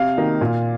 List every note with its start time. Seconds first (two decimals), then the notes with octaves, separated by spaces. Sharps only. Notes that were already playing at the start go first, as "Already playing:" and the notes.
Already playing: C3 F5
0.17 D#3 A#3 D#4
0.41 A#2